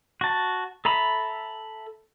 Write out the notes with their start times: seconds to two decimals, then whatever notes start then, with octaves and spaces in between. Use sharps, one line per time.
0.21 F#4 A5
0.85 A4 E5 A#5 B5